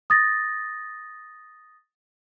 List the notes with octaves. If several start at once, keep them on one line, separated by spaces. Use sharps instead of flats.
D#6 A6 A#6